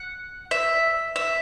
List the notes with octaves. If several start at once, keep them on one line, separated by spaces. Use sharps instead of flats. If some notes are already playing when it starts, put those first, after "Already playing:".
Already playing: F#5
E5
E5